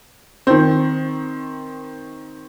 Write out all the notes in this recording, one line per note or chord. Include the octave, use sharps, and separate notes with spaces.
D#3 C4